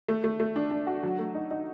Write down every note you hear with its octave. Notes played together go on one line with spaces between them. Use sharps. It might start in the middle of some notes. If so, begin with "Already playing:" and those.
A3
A3
A3
D4
D4
F#4
F#3
A3
D#4
D#4